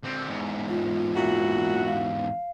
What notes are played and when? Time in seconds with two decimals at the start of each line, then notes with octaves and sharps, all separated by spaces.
0.03 D3 C4
0.27 E2 G#2
0.69 F4
1.15 A#2 E4 F#4
1.86 F5